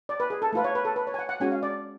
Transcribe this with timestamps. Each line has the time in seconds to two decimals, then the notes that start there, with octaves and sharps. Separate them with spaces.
0.09 D5
0.20 B4
0.30 G#4
0.42 A4
0.53 A3 F4 B4
0.64 C#5
0.75 B4
0.85 A4
0.96 B4
1.07 C#5
1.14 G#5
1.19 F#5
1.29 F#5
1.40 G#3 C#4 F#4 G#5
1.52 F5
1.63 D5